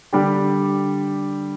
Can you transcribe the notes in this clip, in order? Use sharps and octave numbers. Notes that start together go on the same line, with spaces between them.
D3 G3 D4 G4